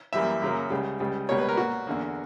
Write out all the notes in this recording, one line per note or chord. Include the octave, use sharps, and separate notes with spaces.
F#2 E3 G3 A#3 E5
F#2 C#3 F#3 A#3
C#2 C#3 G3
C#2 C#3 G3
C#2 B2 G3 A#3 C#5
B4
A#4
A#2 A#3 F#4
E2 D3 A#3